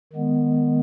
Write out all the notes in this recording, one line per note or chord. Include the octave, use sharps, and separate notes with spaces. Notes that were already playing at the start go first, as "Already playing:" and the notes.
D#3 G#3 B3